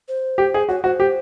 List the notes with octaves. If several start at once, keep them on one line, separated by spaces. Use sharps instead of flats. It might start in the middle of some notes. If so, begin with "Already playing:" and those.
C5
G4
G#4
F#4 C#5
F#4 C5
G4